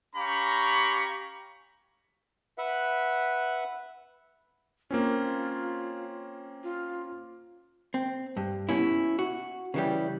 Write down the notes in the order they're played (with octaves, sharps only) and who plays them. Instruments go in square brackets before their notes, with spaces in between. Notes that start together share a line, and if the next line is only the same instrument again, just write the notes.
[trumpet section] C#4 G4 F5 A#5 B5 C#6
[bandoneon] B4 E5 F#5
[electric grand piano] A#3 C4 C#4 [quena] F4
[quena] F4
[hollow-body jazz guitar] C4
G2
B2 C#4 E4
F#4
C#3 E3 G3